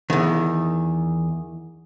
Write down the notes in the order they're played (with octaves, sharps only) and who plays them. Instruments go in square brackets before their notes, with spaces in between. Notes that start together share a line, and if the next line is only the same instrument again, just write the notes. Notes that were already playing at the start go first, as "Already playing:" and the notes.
[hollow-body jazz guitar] E2 D#3